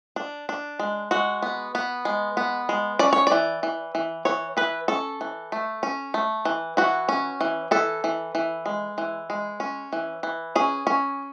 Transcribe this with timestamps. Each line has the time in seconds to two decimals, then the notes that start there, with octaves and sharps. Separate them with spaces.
0.16 D4
0.49 D4
0.79 G#3
1.11 G#3 F#4
1.42 B3
1.75 B3
2.05 G#3
2.37 B3
2.69 G#3
2.99 C#4 D5
3.13 C#5
3.27 E3 D5
3.63 E3
3.95 E3
4.25 E3 C#5
4.57 E3 B4
4.88 C#4 A4
5.21 E3
5.52 A3
5.83 C#4
6.14 A3
6.45 E3
6.77 E3 F#4
7.09 C#4
7.41 E3
7.71 E3 A4
8.04 E3
8.35 E3
8.66 G#3
8.98 E3
9.30 G#3
9.60 C#4
9.93 E3
10.23 E3
10.55 C#4 G#4
10.87 C#4